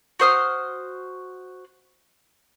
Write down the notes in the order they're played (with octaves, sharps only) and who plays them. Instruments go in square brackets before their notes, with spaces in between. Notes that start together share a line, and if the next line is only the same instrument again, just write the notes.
[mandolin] F#4 C5 D#6 F6